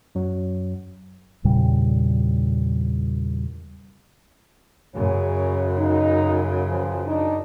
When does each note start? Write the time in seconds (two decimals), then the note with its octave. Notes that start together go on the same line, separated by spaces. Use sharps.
0.15 F#2 F#3
1.44 E2 A#2 C#3 G3
4.95 F#2 C#3 G#4 A#4 C#5
5.78 D#4
6.68 E3 F3
7.06 D4 D#4